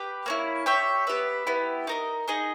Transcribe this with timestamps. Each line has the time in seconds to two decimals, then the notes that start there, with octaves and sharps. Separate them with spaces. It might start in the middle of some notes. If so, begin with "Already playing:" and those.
Already playing: G4 B4 G5
0.26 A#3 C#4 E4
0.66 G4 C#5 E5 G5
1.07 B3 G4 B4 E5
1.47 B3 E4 G4
1.87 D#4 A#4 D#5
2.28 D#4 G#4 D#5